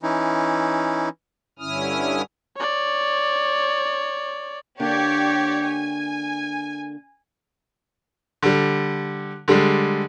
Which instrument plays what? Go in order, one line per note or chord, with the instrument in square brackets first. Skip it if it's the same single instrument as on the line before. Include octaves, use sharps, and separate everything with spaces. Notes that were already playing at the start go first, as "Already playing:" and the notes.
[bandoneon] E3 C#4 D#4 E4
[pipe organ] G2 D3 C#4 E4 D#6 F6
[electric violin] C#5 D5
[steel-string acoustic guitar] D3 A#3 D4 [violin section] G4 C#5 D5
[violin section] G#5
[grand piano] D3 G3
D3 G3 G#3